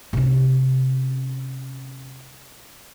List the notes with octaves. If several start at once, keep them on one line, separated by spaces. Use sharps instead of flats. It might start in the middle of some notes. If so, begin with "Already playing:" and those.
C3 C#4